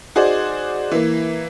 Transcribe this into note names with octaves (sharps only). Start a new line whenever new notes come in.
D#4 F#4 G#4 C5 D5
E3 A#3